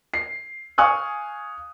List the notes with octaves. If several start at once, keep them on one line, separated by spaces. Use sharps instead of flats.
C7
F5 G#5 C#6 D#6 F#6